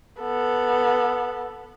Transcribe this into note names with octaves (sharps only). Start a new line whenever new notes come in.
B3 A4